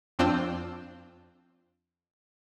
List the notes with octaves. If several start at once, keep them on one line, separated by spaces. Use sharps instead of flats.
F2 C4 D4 F4 C5 E6